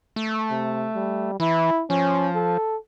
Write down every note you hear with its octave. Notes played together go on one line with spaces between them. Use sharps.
A3
C3
G3
E3 E4
F3 C#4
A4